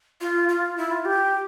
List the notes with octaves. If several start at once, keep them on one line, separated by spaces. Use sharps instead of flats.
F4
F4
E4
F4
G4